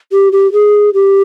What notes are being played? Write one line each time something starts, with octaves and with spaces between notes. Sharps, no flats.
G4
G4
G#4
G4